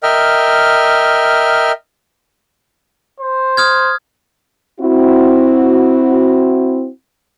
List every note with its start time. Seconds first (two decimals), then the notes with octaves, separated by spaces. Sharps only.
0.03 A#4 D#5 E5 G5 F6
3.20 C5
3.57 D#6 F6 G#6
4.81 C4 E4 F#4